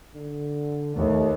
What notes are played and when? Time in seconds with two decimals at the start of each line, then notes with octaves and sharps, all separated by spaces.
0.15 D3
0.96 D#2 A3